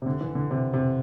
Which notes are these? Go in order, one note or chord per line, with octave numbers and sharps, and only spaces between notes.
C3
D3
E3
D3
C3
C3